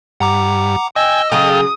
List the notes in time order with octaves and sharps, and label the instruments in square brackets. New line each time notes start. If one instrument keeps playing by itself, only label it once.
[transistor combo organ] G2 [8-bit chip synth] F#5 A#5 D6
[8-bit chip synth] D#5 [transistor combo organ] G5 G#5 [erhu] E6
[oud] C#3 F#3 G#4 [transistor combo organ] A4 F5 G5 [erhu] D#6